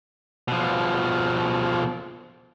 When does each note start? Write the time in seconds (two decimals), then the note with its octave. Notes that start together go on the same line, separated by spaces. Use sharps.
0.48 B2 F3